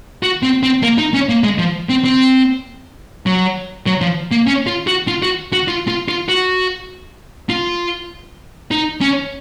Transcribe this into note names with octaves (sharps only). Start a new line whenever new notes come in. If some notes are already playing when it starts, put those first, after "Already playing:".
F#4
C4
C4
A#3
D#4
C#4
A#3
G#3
F3
C4
C4
F#3
F#3
F3
A#3
C#4
F4
F#4
F4
F#4
F#4
F4
F4
F4
F#4
F4
D#4
C#4